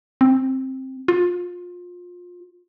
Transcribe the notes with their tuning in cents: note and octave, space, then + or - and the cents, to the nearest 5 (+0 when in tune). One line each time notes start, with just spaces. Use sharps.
C4 +10
F4 +25